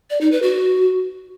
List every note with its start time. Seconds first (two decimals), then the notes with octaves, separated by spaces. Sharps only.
0.10 D5
0.21 D#4
0.32 B4
0.42 F#4